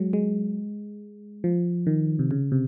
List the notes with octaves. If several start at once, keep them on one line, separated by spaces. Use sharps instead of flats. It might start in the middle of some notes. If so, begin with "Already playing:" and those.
Already playing: F#3 G#3
G#3
F3
D#3
C3
C#3
C3